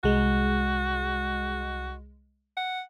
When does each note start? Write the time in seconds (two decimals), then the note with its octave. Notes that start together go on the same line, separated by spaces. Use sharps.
0.04 C2 G#3 F#4
2.57 F#5